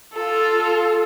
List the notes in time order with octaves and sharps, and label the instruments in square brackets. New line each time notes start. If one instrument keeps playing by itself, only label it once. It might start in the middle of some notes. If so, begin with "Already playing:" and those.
[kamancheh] F4 A4